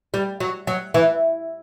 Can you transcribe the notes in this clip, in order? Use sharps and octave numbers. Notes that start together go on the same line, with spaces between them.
G3
F#3
F#3
E3